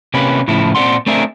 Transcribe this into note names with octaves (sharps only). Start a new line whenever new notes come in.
C3 A#3 C#4 G4 B4
A2 C#3 F3 E4
A#2 C4 B4 D5 F#5 C6
A3 C4 D4 G#4 A#4 E5